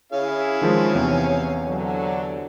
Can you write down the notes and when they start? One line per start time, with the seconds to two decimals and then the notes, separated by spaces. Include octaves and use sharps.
0.12 C#4 E4 G#4 F5
0.62 D#3 F3 G#3
0.95 E2 C3
1.66 D3 F#3